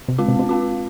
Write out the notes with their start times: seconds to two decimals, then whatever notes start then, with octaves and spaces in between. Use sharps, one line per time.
0.08 C3
0.18 C#3 G#3 C4 F4
0.28 C3
0.39 C3
0.49 G#3 C4 F4